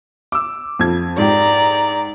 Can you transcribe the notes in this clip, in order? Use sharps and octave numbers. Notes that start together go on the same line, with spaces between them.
D6 E6
F2 G#6
G#2 G4 D5 A#5